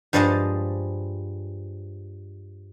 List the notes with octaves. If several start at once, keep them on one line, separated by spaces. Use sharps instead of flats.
G2 F3 G3 G#3 D#5 A5